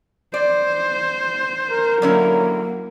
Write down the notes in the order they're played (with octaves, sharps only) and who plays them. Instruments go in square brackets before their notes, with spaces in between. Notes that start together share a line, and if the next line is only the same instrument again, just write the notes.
[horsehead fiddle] C5 [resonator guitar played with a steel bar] D5
[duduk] A#4
[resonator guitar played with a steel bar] D3 C#4 E4 [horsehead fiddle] F#3 A#3